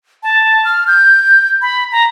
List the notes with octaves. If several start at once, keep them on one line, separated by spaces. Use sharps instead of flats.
A5
F6
G6
B5
A#5